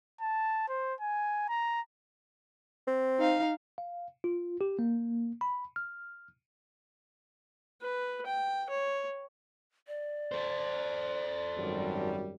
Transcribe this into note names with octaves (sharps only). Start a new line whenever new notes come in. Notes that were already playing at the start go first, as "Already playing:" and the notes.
A5
C5
G#5
A#5
C4
D#4 F5
F5
F4
G4
A#3
B5
F6
B4
G5
C#5
D5
A4 C5
G#1 F#2 G3